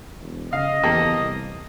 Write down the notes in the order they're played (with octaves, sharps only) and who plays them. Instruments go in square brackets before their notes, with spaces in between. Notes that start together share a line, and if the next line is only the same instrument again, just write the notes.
[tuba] E1
[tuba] C#3 [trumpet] D#5 [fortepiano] F5
[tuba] E2 [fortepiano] A#3 G4 A4
[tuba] C2